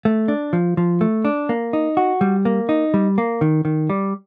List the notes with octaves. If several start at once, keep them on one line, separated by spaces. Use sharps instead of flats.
A3
D4
F3
F3
A3
D4
A#3
D#4
F#4
G3
A#3
D#4
G3
A#3
D#3
D#3
G3